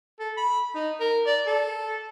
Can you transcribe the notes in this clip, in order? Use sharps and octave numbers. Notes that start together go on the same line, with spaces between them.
A4
B5
D#4
A#4
D5
A4